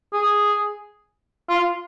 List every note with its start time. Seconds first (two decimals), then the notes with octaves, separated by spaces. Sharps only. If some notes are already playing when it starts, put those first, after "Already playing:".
0.13 G#4
1.49 F4